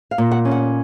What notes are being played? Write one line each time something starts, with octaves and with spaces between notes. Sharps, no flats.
F5
A#2
F#5
C#4
F#5